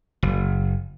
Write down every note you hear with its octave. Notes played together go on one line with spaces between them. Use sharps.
F#1